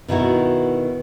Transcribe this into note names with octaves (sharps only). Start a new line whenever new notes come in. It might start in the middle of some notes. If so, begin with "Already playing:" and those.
B2 D#3 E4 F#4